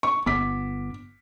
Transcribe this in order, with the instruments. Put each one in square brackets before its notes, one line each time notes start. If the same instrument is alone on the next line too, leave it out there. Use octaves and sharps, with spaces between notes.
[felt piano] C#6
[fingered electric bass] G1 B3 [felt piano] D6 B6